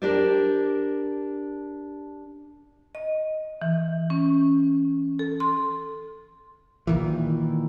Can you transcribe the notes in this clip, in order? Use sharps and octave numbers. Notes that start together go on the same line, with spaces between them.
D4 G4 A#4 C5 D5
D#5
E3
C#4
A4
C6
A#2 D#3 E3